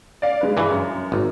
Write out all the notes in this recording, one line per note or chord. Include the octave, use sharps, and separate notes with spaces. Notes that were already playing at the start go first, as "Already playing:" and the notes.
D5 F5
G#3 B4
G2 E3
F#2
G#1